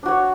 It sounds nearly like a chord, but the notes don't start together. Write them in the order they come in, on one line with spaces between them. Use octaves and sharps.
D4 F#4 C#5